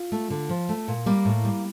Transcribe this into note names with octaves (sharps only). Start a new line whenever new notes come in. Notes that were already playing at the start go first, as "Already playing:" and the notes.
Already playing: F4
A3
D3
F3
A3
A#2
G3 A#3
A2
G3